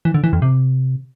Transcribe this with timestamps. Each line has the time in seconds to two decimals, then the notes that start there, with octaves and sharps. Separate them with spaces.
0.05 E3
0.14 D3
0.24 E3
0.33 F2
0.42 C3